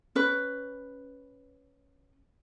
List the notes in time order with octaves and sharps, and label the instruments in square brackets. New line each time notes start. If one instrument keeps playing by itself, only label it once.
[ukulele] C#4 B4